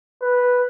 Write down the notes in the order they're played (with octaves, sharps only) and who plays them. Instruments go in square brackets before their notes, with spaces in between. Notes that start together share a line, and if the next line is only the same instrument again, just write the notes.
[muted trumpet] B4